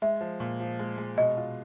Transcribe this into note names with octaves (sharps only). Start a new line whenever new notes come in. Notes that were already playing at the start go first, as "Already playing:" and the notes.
G#3 E5
F3
A#2
F3
G#3
G#3
B2 D#5
F4